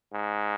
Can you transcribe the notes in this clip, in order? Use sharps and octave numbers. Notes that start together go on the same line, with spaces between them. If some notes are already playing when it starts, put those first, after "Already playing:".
G#2